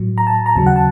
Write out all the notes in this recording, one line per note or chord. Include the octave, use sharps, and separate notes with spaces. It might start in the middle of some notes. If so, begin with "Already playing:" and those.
Already playing: A2 F#3
A#5
A5
A#5
D#2 C#3 F#3 A5
F#5
A5